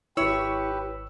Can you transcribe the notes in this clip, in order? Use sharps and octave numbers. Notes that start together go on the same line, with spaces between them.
G#1 E4 G4 B4 C#5 E6